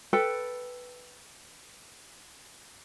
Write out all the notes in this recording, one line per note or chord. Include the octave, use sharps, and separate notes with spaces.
A4 B4 G5